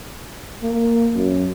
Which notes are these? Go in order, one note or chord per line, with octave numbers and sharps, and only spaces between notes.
A#3
F#2